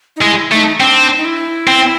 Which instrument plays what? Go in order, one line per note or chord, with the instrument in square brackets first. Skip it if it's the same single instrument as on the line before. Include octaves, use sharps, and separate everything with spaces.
[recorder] D#4
[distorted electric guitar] G#3 [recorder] E4
[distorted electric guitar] A3 [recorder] D#4
[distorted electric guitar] C4 [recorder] D4
[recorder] D#4
E4
[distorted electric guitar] C4